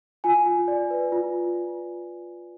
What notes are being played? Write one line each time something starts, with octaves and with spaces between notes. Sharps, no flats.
F4 G#5
F4
D5
B4
F4